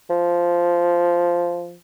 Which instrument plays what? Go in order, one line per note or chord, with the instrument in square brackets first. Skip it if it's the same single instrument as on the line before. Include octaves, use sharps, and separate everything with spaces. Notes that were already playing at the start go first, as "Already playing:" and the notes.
[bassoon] F3